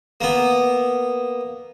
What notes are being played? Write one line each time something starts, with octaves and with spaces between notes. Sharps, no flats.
A#3 B3